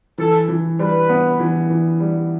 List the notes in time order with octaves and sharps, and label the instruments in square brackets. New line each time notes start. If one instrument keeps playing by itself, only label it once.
[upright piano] E3 [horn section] A4
[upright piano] E3
[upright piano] G3 [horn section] B4
[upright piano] B3
E3
E3
G3